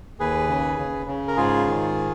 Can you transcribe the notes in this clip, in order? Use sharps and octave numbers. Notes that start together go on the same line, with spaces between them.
D#2 G#4 B4
C#3
C#3
C#3
A#4
G#2 F4 G#4
D#3